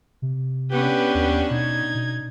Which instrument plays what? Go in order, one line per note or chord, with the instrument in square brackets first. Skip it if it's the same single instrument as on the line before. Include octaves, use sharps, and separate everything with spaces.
[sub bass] C3
[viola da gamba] B3 C#4 D4 [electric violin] G4 B4
[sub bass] D#2
[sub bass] B2 [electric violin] D#4 G#6
[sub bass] B2